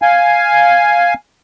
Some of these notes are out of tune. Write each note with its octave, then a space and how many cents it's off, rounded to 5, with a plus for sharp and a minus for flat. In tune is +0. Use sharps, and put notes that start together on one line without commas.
F5 +0 G#5 +0